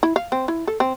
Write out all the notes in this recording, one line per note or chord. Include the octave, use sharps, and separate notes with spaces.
E4
F5
C4
E4
A4
C4